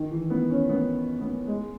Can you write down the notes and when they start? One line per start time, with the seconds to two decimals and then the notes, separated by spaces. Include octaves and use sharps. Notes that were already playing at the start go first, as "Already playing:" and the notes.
Already playing: D#3
0.11 E3
0.30 B3
0.50 C#4
0.69 B3
1.21 B3
1.47 G#3